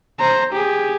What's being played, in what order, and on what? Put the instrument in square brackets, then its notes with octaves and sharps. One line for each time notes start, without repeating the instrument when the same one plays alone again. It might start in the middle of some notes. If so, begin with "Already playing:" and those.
[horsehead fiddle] C5 A#5
G4 G#4